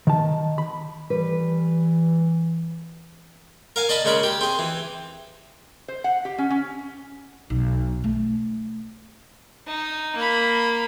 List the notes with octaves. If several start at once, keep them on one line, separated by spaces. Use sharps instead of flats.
D#3 A5
B5
E3 G3 B4
A#4 F5 G#5
D5 D#5 A5 B5
C#3 G#3 A#4 B5
G4
C4 G#4
E3
C5
F#5
G4
C#4
C#4
B1
A3
D#4
A#3 B5